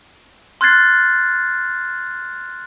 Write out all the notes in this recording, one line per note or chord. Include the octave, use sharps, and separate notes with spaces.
C6 F6 F#6 G#6 A6 C7